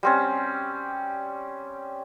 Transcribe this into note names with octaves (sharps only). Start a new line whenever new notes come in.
G3 C4 C#4